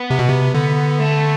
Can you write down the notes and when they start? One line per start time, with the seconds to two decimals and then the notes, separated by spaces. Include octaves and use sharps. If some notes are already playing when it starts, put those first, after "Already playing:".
Already playing: B3
0.10 C3
0.19 B2
0.29 C3
0.55 D3
1.00 A3